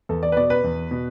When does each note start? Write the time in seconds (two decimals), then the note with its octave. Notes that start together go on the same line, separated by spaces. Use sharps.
0.09 E2 A4
0.23 D5
0.32 B4
0.37 B2 D5
0.50 B4
0.64 E2
0.91 B2